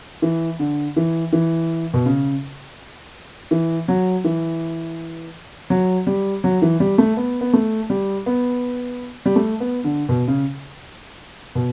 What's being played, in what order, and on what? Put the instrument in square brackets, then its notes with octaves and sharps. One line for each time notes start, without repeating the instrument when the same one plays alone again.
[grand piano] E3
D3
E3
E3
B2
C#3
E3
F#3
E3
F#3
G3
F#3
E3
G3
A3
B3
B3
A3
G3
B3
G3
A3
B3
D3
B2
C#3
B2